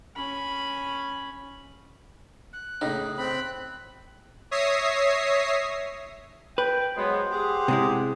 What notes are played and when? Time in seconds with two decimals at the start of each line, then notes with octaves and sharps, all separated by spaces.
0.16 C#4 B5
2.53 F#6
2.81 A2 C#3 D#4
3.18 C4 B5 F#6
4.51 C#5 E5 D#6 A#6 C7
6.58 B4 G5
6.97 F#3 G#3 B3 C5
7.32 G4 G#4 F#5
7.68 C3 G#3 E4